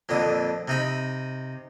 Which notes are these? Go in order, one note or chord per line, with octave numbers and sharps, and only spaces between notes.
F2 A#2 D3 D#6
C3 D#4 B5